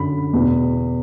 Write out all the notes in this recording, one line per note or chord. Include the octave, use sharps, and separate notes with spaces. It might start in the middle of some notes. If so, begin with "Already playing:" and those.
Already playing: F#2 D3 B5
E2 B2